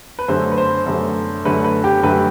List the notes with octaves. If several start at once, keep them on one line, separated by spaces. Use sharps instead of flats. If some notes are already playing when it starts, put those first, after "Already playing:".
B4
F#2 D3 A3 C5
B4
C5
F#2 D3 A3
F#2 D3 A3 B4
B4
G4
F#2 D3 A3 B4